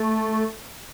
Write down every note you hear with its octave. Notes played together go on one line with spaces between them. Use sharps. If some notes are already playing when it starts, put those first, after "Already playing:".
Already playing: A3